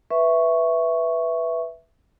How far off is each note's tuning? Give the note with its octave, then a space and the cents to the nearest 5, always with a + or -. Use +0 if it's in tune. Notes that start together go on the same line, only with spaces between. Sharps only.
B4 +0 E5 +0 C#6 +0